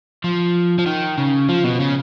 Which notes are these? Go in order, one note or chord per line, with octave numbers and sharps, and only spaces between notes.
F3
F3
D#3
C#3
F3
B2
C#3